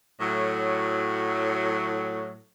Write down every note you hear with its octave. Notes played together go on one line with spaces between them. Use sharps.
A2 F#3